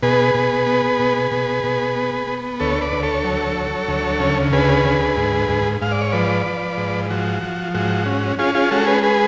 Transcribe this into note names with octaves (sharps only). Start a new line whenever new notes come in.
B2 G#4 B4
B2
B3
B2
B2
B2
B3
B3
D2 A4 C#5
B4 D5
D2
A4 C#5
F#3
F#3
D2
C#3
D2 G#4 B4
D2
G#2
G#2
G#2 F5
D5
C#5
F3 B4 D5
F3
G#2
F3 F#4
F3
G#2 F#4
C#4
C#4 F4 G#4
F4 G#4
G#3 F#4 A4
G#4 B4
G#4 B4